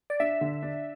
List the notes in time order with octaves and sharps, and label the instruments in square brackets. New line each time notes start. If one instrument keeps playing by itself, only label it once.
[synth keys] D5
[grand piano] D4 [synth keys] E5
[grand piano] D3
D4